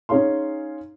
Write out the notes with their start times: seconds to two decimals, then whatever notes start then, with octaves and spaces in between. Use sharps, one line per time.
0.09 C#4 D#4 G#4 C#5 F5 C6